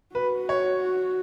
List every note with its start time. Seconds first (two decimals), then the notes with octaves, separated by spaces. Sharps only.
0.15 F#4 B4
0.49 C#5